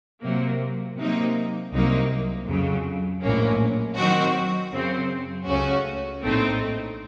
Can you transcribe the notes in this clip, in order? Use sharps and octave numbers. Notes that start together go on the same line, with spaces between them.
C3 F#3 A#3
C3 F#3 A#3 D#4
C2 C3 F#3 A#3 D#4
F2 C#3 F#3
A#1 A2 F#3 A#3 C#4
D#3 F#3 C4 F#4
F#2 C#3 F#3 C4
C#2 C#3 A3 C#4 F#4
A#1 A2 A3 C4 D#4